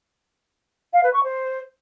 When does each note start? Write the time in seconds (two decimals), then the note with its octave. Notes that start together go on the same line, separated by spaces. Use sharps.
0.93 F5
1.03 B4
1.13 C#6
1.23 C5